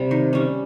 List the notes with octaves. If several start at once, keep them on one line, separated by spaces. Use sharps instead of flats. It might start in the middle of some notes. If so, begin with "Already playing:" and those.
Already playing: C3 G3
D#3
G3 C#4